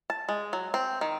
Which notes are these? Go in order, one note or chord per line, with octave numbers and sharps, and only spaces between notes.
A5
G#3
F#3
C4
D#3